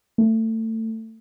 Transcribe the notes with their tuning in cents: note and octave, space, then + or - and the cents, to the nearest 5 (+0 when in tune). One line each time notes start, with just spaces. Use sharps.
A3 +25